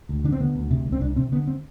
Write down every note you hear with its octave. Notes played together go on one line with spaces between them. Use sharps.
D2
D3 D4
C4
D3 B3
D2
C3
C2
C4
C2 D4
C3 C4
D3 B3
C4